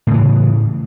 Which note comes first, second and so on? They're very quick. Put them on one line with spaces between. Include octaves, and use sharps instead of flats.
A2 C#3 E3